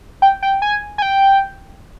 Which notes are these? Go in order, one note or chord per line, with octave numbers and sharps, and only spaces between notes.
G5
G5
G#5
G#5
G5